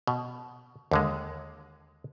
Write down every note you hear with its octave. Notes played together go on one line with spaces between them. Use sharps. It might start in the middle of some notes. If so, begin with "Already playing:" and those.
B2
D#2 D3 G#3